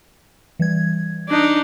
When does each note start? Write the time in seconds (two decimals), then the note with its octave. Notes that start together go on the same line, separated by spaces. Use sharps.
0.59 E3 G3 G#6
1.29 D4 D#4